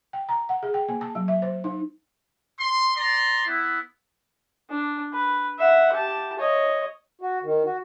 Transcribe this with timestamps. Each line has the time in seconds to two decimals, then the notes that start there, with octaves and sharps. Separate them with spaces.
0.13 G5
0.29 A#5
0.49 F#5
0.63 G#4
0.74 G5
0.89 A#3
1.01 A5
1.15 F#3
1.28 E5
1.42 C5
1.64 D#4
2.59 C6
2.96 D5 A#5 C6
3.46 B3 E4
4.70 D4
5.13 B4
5.59 E5 F#5
5.93 G4 A5
6.39 C#5 D#5
7.21 F#4
7.43 D#3
7.65 F#4